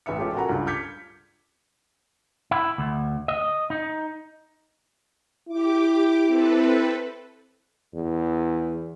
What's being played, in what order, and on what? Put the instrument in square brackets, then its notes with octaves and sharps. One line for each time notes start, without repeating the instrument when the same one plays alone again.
[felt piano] A1 B4 E5 C#7
G#3 C#4 F4 G4 A4
F#4 A4 A#4 F#5 G#5 A#5
C#2 G2
D6 F6 G6 G#6 B6 C#7
[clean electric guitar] E4
D2
D#5
D#4
[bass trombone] E4 [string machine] G4 D6
[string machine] C4 A4 B4
[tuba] E2